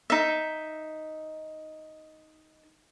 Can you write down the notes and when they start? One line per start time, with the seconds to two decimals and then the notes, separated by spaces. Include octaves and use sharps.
0.10 D#4 E5